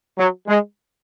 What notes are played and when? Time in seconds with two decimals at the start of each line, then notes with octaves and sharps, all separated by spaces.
0.16 F#3
0.47 G#3